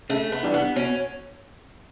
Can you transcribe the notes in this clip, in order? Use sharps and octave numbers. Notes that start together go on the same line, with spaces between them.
C#3 A3
B3
E3 G3 D4
B3
B2 C#4